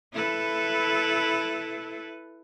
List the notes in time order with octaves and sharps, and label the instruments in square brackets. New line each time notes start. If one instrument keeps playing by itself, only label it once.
[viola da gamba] E4 A4 B4